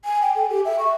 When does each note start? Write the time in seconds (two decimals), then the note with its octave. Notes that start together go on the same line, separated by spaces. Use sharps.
0.05 G#5
0.22 G5
0.35 A4
0.50 G4
0.65 E5
0.79 C#6